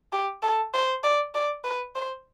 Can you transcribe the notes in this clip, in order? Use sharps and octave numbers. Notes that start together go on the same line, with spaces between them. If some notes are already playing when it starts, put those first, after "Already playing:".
G4
A4
C5
D5
D5
B4
C5